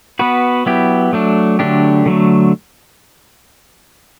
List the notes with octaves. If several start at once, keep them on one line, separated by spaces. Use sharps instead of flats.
B3 F#4 B4
F#3 B3 E4 G4
F#3 A3 D4
D3 F#3 A3 D4 G4
D3 F#3 A3